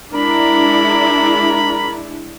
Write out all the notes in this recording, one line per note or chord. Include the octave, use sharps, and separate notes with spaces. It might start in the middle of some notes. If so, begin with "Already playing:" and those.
G#3 D4 E4 A#4 A#5 B5